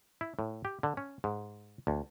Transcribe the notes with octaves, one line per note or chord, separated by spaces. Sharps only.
E4
A2
G4
D3
C#4
G#2
D2